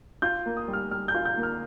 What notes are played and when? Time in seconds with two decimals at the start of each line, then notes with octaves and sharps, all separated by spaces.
0.22 F4 G6
0.46 A#3
0.57 D#6
0.68 G3
0.73 F6
0.91 G3 F6
1.08 G6
1.14 F4
1.25 G6
1.37 A#3
1.43 F6